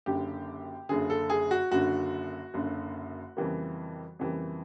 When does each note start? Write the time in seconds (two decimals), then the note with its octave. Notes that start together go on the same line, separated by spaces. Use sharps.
0.06 F#1 F#2 D3 G4
0.89 F#1 F#2 D3 G#4
1.10 A4
1.30 G#4
1.51 F#4
1.71 F#1 F#2 D3 F#4
2.54 F#1 F#2 D3
3.37 F2 C#3 E3 G3 A#3
4.19 F2 C#3 E3 G3 A#3